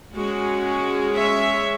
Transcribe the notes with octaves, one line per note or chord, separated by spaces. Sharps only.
G#3 C#4 F#4
C#5 E5